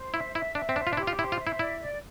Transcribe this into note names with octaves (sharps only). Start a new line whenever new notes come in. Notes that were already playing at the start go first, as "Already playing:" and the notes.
Already playing: C5
E4 E5
E4 E5
D4 E5
C4
D4 C5
F4
D4
E4 G4
F4
E4 C5
F4
E5
E4
E4 D5
D5